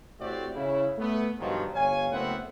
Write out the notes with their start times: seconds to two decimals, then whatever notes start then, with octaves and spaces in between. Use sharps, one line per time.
0.20 A2 A3 C4 F#4 G4 D5
0.55 C#3 E4
0.98 A3 B3
1.40 G2 B2 D#3 F3 F#3
1.75 G1 C#5 F5 G#5
2.12 F#1 A3 B3 C4 E5 F#5